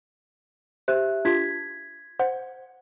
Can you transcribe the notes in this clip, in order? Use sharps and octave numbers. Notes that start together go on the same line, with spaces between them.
G4 C5 E5 F#6
D4 F4 G4 G#6 B6
C5 F#5